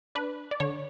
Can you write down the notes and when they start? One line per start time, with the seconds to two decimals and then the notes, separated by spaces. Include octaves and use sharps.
0.15 D4 B4
0.51 D5
0.60 D3 C#5